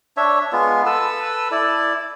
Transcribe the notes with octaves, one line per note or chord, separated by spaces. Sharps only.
D4 C#5 E5
G#3 B3 F4
A4 B4 E6
E4 D5